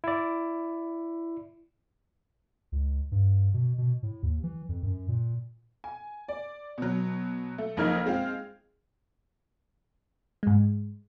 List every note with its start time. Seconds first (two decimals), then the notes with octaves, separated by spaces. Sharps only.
0.04 E4 D5
2.72 C#2
3.12 G2
3.54 B2
3.78 B2
4.03 A2
4.23 D#2
4.43 E3
4.69 F2
4.83 F#2
5.08 A#2
5.84 G#5
6.28 D5
6.78 B2 F#3
7.58 A3
7.77 F#1 F2 D#4 A#4 F6 G#6
8.06 G#3 C4 F4 F5
10.43 G#2 G#3